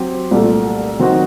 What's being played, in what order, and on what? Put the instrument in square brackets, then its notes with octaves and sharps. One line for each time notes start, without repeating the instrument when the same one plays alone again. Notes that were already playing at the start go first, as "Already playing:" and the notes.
Already playing: [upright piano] F#3 C4 G4
C2 A#2 A3
D#3 F#3 C4 D#4 F#4